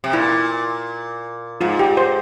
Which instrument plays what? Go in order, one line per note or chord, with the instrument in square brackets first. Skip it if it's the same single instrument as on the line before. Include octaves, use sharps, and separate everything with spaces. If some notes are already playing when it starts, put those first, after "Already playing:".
[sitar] C3
[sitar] A#2 [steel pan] E4
[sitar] G#2 [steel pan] F4
[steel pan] G4
C5